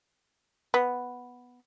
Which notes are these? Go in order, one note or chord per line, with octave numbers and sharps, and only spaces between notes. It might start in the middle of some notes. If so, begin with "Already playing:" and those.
B3